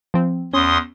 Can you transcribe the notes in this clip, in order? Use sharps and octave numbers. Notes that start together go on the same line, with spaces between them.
F3 C4
E2 C#4 C6 D#6